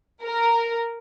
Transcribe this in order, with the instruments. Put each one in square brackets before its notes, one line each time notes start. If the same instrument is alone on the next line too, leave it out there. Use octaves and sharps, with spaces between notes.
[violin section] A#4